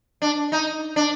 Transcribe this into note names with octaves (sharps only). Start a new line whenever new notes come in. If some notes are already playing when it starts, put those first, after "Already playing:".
D4
D#4
D4